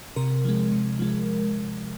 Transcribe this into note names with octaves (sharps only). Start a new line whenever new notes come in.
C3 A#4
F3 G#3
C3
F3 G#3